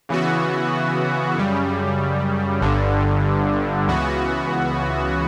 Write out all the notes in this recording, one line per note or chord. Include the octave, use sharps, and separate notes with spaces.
C#3 E3 B3 F#4
F#2 C#3 G3
G1 G2 D3
C#2 C#3 E3 B3 F#4